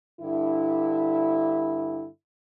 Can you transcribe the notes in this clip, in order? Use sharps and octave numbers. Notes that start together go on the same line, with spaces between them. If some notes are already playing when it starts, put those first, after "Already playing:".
G2 D3 E4